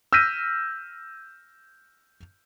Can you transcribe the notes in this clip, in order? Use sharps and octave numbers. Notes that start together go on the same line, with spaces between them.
E6 F6 G6 A#6 B6 D#7